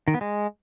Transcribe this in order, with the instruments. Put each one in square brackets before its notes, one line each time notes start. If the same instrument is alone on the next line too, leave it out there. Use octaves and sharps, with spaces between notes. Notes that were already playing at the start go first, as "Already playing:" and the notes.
[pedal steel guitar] D#3
B3
G#3